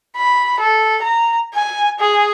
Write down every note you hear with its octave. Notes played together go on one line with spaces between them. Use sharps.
B5
A4
A#5
G#5
G#4